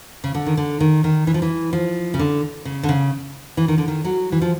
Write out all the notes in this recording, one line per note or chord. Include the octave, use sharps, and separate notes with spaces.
C#3
D3
D#3
D3
D#3
D#3
E3
F3
E3
F3
C#3
D3
C#3
D3
C#3
E3
D#3
D3
D#3
F#3
E3
F3